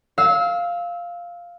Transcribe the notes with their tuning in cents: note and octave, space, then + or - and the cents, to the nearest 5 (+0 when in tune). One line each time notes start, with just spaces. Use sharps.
F5 +0 E6 -25